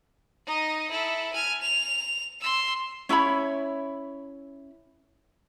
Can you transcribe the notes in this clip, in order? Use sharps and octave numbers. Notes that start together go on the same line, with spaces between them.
D#4 D#5
E4 A4
G#5 F6
F7
C6 E6
C#4 E4 C#5 B5